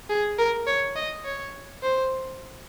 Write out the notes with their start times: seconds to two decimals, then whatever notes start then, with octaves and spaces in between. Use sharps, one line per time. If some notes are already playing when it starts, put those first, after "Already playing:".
0.10 G#4
0.39 A#4
0.67 C#5
0.96 D#5
1.25 C#5
1.83 C5